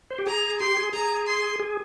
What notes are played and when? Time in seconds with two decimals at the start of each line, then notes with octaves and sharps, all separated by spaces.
0.10 C5
0.18 G4
0.27 G#4 A#5
0.60 G4 C6
0.77 G#4
0.93 G#4 A#5
1.27 C6
1.60 G#4